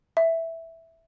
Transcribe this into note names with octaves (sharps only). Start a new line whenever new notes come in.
E5